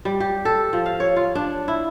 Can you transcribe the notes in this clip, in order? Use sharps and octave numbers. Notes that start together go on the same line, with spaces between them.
G3
G4
A4
F3
F5
C#5
F4
D4
E4